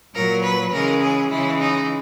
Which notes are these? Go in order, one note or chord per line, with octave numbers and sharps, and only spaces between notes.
A#2 F#3 A#4
B4
C#3 E3 G#3 A#4
G#4
C#3 E3 G#3 E4
D#4